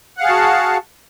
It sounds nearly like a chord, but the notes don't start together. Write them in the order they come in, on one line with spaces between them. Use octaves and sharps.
F#5 F5 G#4 A5 F#4